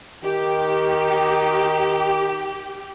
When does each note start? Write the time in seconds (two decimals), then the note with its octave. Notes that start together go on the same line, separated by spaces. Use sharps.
0.24 D#3 G4